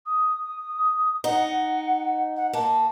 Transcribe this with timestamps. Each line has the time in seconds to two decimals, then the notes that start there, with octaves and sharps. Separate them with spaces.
0.05 D#6
1.24 D#4 F#5
2.36 F#5
2.53 A#3 A5